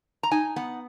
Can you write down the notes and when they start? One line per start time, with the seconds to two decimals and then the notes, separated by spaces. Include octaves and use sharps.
0.23 A#5
0.31 D#4 G#5
0.56 B3 F#5